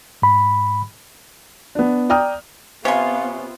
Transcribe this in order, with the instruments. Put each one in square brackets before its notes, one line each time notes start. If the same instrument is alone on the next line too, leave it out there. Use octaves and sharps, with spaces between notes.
[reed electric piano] G#2 B5
[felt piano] B3 D4
D5 G5 A#5 D#6 F6
[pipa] C3 [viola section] B3 C4 F4 [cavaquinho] C#5 G#5 C6 [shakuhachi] F5